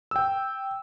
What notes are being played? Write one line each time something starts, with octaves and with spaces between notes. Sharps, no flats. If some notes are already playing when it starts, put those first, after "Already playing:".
G5 E6